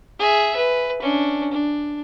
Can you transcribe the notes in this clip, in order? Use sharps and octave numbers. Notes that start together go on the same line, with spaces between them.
G#4 E5
B4
C#4 D4
D4